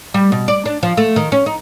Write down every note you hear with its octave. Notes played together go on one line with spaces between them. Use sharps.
G3
B2
D5
D4
F3
A3
D#3
C#4
D#4